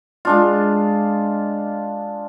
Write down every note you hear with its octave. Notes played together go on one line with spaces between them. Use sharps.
G#3 D4 F4